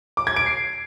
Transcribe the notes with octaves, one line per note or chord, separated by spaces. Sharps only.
D6
G#6
D7
C7